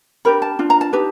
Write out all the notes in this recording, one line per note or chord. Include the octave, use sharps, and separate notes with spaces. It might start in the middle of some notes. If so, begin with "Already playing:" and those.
D4 G4 A#4 B5
A5
D4 F4
A#5
A5
D#4 G4 B4